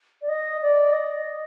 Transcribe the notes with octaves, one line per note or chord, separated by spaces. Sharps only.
D5
D#5
D5
D#5